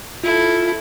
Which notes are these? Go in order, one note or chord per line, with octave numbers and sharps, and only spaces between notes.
E4 F4 A4